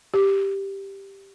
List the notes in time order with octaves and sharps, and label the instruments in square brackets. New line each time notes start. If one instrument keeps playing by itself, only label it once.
[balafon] G4